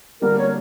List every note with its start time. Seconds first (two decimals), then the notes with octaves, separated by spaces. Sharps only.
0.21 D3 G3 A#3 D4 F#4 A#4
0.38 C#5